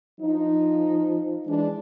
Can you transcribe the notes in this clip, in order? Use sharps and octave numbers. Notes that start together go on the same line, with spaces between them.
F3 D#4
E3 G#3 D4